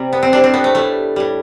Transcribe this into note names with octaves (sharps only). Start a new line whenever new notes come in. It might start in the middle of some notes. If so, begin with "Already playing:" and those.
Already playing: C3 G3
B3
C4
A2 G3 D4
C4
B3
A3
A2 G3 A3
A2 G3